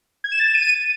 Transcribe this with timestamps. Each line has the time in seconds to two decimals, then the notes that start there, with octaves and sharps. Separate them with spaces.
0.24 G#6
0.32 E7
0.39 A6
0.47 E7
0.55 D#7